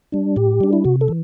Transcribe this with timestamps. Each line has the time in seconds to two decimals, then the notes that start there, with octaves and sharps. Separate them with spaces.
0.12 G3 D4
0.36 A2 G4
0.61 G3 D4
0.73 E4
0.85 C3 F#4
1.01 A4
1.08 E3